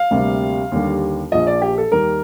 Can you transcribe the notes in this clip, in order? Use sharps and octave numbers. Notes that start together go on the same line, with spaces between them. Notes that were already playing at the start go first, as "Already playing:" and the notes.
Already playing: F5
D2 C3 G3 A#3
D#2 D3 G3
A#1 A#2 F3 D#5
D5
G4
A4
D#2 D#3 G3 A#3 A#4